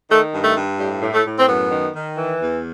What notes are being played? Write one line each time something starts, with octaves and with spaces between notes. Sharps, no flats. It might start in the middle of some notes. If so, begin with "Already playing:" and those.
D#3 A3
G2
A3
G2
A2 G3
A2
A3
A2
C4
F#2 B3
D#3
D#3
E3
E2